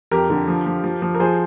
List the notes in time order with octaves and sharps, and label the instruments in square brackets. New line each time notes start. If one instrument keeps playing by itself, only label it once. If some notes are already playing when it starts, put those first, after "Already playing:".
[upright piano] F2 G4 A#4
D3
F3
F3
F3
F3
A#4
F3 G#4 C5